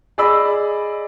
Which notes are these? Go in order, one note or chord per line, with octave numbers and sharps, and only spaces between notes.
G#4 D5 D#5 B5 E6